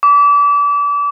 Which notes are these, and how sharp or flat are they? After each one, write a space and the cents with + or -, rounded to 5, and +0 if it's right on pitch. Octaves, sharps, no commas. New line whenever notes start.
D6 -30